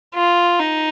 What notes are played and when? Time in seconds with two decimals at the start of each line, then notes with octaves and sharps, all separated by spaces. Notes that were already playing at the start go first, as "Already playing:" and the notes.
0.15 F4
0.60 D#4